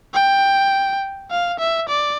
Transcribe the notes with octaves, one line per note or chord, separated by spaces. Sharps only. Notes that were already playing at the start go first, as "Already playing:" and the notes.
G5
F5
E5
D5